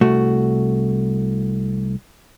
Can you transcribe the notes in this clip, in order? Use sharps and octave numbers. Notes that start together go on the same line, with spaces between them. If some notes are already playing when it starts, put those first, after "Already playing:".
C2 A3 F#4